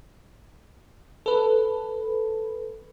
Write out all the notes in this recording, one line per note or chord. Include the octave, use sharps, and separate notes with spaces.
A4 B4